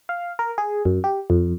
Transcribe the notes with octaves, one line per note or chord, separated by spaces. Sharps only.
F5
A#4
G#4
F#2
G4
F2